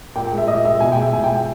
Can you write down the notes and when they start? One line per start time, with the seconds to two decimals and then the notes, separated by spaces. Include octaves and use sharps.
0.16 A#2 G5
0.27 G#3 G5
0.38 E5
0.48 A#2 D#5
0.64 G#3 E5
0.80 B2 G#5
0.92 G#3 G5
1.02 E5
1.13 B2 G#5
1.24 G5
1.29 G#3
1.35 G5